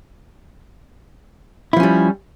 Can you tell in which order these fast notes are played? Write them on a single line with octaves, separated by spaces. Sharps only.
E4 F3 C#4 G3